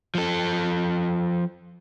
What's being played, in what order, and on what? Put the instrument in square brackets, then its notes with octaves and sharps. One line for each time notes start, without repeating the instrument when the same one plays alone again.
[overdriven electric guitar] F3 A4